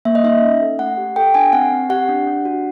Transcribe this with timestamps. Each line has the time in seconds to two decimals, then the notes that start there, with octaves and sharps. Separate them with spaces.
0.05 A#3 E5
0.15 D#5
0.24 D#4 E5
0.42 C#4
0.62 A4
0.79 A3 F#5
0.97 G4
1.16 A4 G5
1.34 D4 G#5
1.53 C4 F#5
1.72 C4
1.90 G4 F#5
2.09 D4
2.27 D4
2.45 F#4